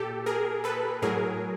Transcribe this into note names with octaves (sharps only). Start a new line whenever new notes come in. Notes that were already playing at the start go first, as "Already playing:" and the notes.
Already playing: A#2 G4 A4
G#4 A#4
A4 B4
A2 F#3 G#4 A#4